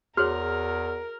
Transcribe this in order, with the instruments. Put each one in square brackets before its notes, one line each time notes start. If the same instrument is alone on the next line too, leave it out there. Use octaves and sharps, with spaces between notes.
[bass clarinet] E2 [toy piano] F#4 G#4 C#5 [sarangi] A#4 [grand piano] F6